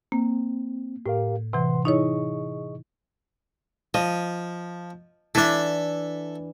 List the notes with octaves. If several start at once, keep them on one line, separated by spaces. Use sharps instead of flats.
A#3 C4
A2 G4 A#4 F5
C3 E3 B4 F#5 C6
D#4 E4 G#4 C#5 D#5 C#6
F3 D#5
E3 D4 A4 E5